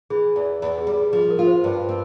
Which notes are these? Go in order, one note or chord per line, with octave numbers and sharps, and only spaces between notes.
E3 G#4
E2
E2
G#4
G3
G#4
F3 G#4
A#4
F4
C5
G2
C4